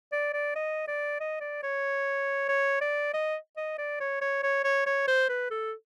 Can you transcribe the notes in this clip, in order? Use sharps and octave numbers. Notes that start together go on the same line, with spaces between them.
D5
D5
D#5
D5
D#5
D5
C#5
C#5
D5
D#5
D#5
D5
C#5
C#5
C#5
C#5
C#5
C5
B4
A4